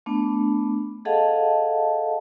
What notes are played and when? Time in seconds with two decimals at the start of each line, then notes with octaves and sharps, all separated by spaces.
0.06 A3 B3 D4
1.05 G#4 A4 D#5 F5 F#5 A5